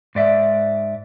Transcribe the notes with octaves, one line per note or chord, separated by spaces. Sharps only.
G#2 D5 E5